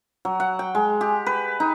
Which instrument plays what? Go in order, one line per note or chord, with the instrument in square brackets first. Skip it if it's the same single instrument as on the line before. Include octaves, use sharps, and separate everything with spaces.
[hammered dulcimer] F#3
F#5
G5
G#3
G4
B4
D#4